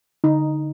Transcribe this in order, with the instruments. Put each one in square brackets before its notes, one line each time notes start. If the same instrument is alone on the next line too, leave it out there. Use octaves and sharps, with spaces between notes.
[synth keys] D3 [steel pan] D#4